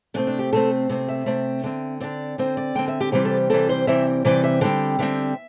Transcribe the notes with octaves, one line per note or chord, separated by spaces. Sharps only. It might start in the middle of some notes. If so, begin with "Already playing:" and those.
C3 A3 C4 D4
D4
G4
C3 A3 C4 A4
C3 A3 C4
E5
C3 A3 C4
D3 C4
D3 C4 D5
D3 C4 C5
D5
D3 C4 G5
E5
G4
C3 E3 G3 C4 G4
A4
C3 E3 G3 C4 A4
C5
C3 E3 G3 C4 E5
C3 E3 G3 C4 D5
E5
D3 G3 C4 G5
D3 G3 C4 E5